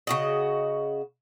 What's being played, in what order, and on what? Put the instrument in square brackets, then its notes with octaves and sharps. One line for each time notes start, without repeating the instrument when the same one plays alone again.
[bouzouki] C#3 F#4 D#5